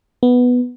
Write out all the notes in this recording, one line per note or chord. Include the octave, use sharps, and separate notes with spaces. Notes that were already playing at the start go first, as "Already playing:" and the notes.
B3